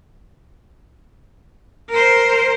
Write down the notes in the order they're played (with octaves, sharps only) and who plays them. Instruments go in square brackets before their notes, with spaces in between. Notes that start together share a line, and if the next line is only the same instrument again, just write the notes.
[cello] A#4 C5